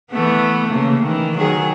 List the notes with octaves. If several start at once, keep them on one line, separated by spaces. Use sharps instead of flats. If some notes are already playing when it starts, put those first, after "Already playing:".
E3 A3 B3
C#3 A#3
D#3 E3
D#3 F#3 G#4